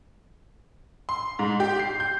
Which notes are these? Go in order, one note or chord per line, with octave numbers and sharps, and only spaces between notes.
C6
G#2
G4
C7
G6